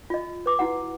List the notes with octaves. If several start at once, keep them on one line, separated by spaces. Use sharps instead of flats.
F4 D#5
B4 D6
E4 F#4 F#5